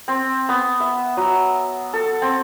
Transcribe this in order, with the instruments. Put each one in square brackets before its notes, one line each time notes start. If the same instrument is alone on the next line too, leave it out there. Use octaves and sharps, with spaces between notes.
[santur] C4
B3
E5
F#3
A4
C4